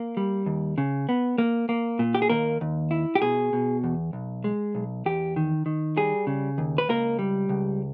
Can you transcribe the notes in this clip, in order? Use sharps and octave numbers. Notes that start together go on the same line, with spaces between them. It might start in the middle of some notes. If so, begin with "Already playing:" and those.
Already playing: A#3
G3
D#2
C#3
B3
A#3
A#3
A#2
G4
G#4
D#2 A#3 A#4
D#2
E4
G4
B2 G#4
B2
E2
B1
G#3
B1
E2 G4
D#3
D#3
G3 G#4
C#3
D#2
B4
C#2 A#3 A#4
G3
C#2